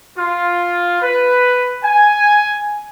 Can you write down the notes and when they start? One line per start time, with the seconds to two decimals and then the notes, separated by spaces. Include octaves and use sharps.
0.17 F4
1.02 B4
1.84 G#5